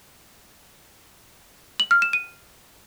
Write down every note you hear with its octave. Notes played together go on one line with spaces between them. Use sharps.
F#7
F6
E7
D#7